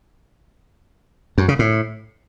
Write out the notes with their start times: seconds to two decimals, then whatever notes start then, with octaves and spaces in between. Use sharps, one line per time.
1.38 F#2
1.48 C#3
1.59 A2